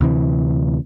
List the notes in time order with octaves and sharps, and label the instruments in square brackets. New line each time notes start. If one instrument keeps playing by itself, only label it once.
[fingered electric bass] D2 C3 E3